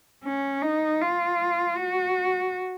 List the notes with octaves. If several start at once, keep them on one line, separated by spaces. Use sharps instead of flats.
C#4
D#4
F4
F#4